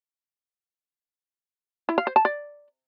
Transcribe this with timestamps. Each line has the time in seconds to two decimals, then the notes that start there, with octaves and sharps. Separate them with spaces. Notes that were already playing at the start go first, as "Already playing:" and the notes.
1.89 E4
1.98 F5
2.07 C5
2.16 A5
2.25 D5